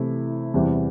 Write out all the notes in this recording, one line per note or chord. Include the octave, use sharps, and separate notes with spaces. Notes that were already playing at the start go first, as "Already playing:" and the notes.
Already playing: C3 E3 A3 E4
E2 C3 E3 G3